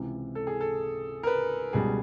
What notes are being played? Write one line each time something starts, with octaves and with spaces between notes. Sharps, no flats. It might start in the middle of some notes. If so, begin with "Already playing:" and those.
Already playing: C#2 C3 E3
A4
G#4
A4
A#4
B4
C#2 B2 G3 G#4